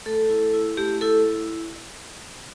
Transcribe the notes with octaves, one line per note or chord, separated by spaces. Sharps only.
A3 A4
E4
E4
A3 G4
E4 A4